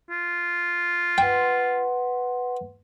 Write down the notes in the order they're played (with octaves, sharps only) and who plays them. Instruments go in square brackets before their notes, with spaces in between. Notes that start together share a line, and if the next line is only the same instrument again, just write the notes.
[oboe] F4
[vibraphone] B4 F#5 C6 [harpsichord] G5